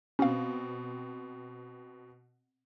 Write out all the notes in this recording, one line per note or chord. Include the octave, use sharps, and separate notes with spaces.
B2 C4 C#4 F5